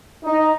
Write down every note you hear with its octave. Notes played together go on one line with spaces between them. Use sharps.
D#4